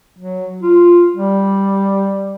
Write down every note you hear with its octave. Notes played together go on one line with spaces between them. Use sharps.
F#3
F4
G3